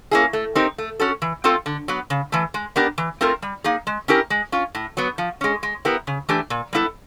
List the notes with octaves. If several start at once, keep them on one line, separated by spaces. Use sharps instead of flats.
A#3 C#4 E4 G#4
A3
C4 D#4 G4 A#4
A3
C#4 F#4 A4
E3
A3 C4 F4 A4
D3
F#3 B3
C#3
E3 A3
G#3
B3 D4 G4 A#4
E3
A3 C4 F4 A#4
G3
A#3 D#4 G#4
G#3
C#4 E4 G4 A#4
G#3
C#4 F4
A2
F#3 B3
F3
G#3 C#4
G#3
B3 E4 G4 A#4
C#3
E3 A3 D4 G4
A#2
G3 B3 E4 A4